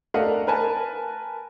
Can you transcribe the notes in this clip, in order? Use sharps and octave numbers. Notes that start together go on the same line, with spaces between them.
A3 D4 A#4 D#5 F5 F#5
A#4 B4 G#5 A5